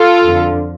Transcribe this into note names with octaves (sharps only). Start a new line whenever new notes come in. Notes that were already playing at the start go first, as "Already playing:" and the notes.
Already playing: F4 A4
F2 D3